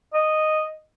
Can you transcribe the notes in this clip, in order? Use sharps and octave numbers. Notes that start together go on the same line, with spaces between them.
D#5